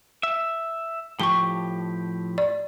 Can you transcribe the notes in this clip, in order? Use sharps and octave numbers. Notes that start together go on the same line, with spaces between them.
E5
A2 F3 G4 C#6 G7
D5